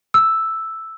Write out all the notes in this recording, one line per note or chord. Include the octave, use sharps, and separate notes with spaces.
E6